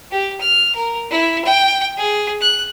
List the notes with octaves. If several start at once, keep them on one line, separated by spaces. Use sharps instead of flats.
G4
F6
A#4
E4
G5
G#4
F#6